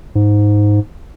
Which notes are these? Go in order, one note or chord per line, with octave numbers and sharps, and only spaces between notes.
G#2